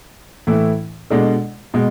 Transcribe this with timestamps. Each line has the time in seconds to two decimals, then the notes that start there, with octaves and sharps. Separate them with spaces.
0.47 A2 E3 A3 E4
1.10 B2 G#3 D4 A4 D5
1.74 B2 G#3